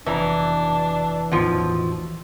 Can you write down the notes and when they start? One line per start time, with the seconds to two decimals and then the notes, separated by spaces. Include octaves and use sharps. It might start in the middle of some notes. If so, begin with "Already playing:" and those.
0.06 F1 B2 E3 D4 A#5
1.32 A1 E2 B2 D#3 F3